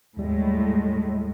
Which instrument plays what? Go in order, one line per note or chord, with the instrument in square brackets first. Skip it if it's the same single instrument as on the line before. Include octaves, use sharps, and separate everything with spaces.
[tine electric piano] D#2 G3 [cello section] A2 G#3